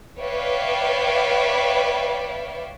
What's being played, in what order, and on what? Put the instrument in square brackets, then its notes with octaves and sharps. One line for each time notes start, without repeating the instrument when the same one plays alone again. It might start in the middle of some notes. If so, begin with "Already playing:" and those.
[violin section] B4 C#5 D5 E5 F5 G5